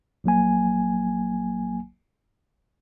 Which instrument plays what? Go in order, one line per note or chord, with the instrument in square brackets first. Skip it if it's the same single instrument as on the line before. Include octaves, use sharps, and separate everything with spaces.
[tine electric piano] A#1 F#3 A#3 G#5